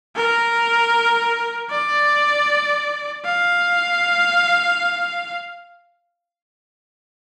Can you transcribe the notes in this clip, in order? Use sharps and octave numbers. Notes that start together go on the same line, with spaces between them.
A#4
D5
F5